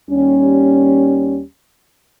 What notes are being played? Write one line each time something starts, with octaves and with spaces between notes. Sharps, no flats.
D#2 G3 C#4